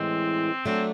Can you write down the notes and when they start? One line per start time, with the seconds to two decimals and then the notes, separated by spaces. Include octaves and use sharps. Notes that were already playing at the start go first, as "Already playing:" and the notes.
Already playing: A2 E3 G#3 C4
0.66 F#3 A3 C4 D4